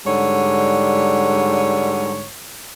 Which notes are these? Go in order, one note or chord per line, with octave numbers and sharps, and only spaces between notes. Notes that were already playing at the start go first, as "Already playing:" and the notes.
G#2 D3 G3 C#5